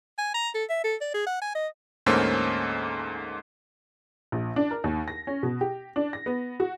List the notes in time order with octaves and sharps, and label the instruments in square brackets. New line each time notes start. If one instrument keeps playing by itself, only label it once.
[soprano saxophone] G#5
A#5
A4
E5
A4
D5
G#4
F#5
G#5
D#5
[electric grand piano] D2 G#2 A#3 C#4 A4 C5
[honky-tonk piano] A#1
D4
A#4
D#2
A#6
C#4
B2
G4
D4
A#6
B3
F#4